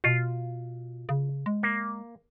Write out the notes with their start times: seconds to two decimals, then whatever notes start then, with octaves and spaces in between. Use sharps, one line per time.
0.04 B2 F4
1.09 C#3
1.46 G#3
1.63 A#3